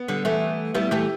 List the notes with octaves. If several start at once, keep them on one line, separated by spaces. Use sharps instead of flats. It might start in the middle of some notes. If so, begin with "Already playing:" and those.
Already playing: B3
D3 G3
E3 A3
G3 B3 E4
E3 A3 G4